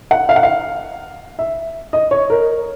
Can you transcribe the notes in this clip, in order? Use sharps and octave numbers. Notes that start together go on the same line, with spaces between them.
F#5
F5
F#5
F5
E5
D#5
C#5
A#4